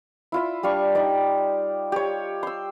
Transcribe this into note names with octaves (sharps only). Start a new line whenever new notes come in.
E4 F4 E5
G3 D4 F5 C#6
D#4 D5 G5
G4 C#5
C6 E6